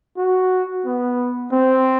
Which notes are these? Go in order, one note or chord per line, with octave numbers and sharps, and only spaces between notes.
F#4
B3
C4